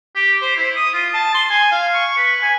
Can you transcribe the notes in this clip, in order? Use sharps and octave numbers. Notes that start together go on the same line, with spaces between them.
G4
C5
E4
D#6
F4
A5
C6
G#5
F5
C#6
B4
G#5